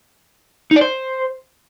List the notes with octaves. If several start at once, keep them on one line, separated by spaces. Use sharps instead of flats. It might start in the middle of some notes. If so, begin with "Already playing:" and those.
D#4
D5
C5